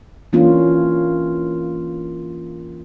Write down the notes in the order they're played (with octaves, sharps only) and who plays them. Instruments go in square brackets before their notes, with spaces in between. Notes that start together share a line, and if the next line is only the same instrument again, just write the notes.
[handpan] E3 A#3 C#4 D4 F4